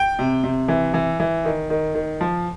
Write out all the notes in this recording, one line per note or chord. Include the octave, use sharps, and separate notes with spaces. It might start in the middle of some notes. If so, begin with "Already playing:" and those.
Already playing: G5
C3
C3
E3
E3
E3
D#3
D#3
D#3
F3